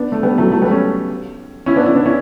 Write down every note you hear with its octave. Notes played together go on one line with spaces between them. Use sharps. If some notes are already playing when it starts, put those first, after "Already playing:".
Already playing: B3 D4
A3
G3 B3
F#3 A3
F#3 A3
G3 B3
A3 C#4
C#4 E4
B3 D4
C#4 E4
B3 D4
C#4 E4